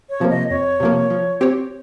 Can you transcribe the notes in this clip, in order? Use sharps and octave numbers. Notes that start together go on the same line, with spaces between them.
C#5
C3 F3 A#3
D#5
F2 C#5
C3 F3 A#3
F3
C4 G4 C#5